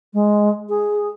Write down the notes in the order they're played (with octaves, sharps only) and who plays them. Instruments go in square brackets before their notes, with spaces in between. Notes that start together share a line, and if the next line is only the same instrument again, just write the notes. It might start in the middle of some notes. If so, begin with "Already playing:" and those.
[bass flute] G#3
G#4